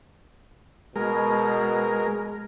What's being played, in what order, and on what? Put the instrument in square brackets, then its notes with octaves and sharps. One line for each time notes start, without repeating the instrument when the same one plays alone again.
[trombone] B2 [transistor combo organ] G#3 A#4